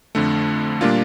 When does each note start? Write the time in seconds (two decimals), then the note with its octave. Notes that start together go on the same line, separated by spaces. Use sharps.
0.15 F2 D3 A3
0.81 A#2 G3 A#3 D4 F4